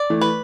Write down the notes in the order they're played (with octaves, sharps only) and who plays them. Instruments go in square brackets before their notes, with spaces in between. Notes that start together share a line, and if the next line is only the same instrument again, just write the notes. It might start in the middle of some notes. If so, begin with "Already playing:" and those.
Already playing: [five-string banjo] D5
[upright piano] E3 A3
[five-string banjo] B4